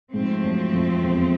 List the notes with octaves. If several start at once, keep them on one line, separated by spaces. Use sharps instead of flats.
G#2 F3 A3 C4
F#2
F2
E2